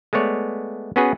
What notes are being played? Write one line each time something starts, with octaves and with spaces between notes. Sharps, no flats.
G#3 A3 B3 C#5 D5
B3 C#4 F#4 G#4 B4